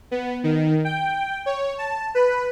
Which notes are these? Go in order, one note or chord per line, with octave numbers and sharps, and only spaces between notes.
B3
D#3
G5
C#5
A5
B4